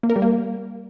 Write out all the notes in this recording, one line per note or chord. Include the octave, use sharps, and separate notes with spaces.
A#3
A#4
G3
A#3